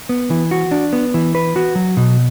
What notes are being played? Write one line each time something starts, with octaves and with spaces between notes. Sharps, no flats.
B3
E3
F#4
D4
B3
E3
B4
F#4
F#3
B2